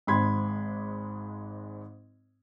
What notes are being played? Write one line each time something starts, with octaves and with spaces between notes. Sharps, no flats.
G#1 G#2 G#3 B5 C6 G#6